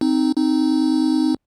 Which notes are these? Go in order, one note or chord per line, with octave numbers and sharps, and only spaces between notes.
C4 D#4
C4 D#4